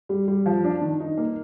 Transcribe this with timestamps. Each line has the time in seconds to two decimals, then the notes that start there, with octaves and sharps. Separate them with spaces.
0.09 G3
0.28 G3
0.46 F3
0.64 D4
0.81 D#3
1.00 D#4
1.17 A#3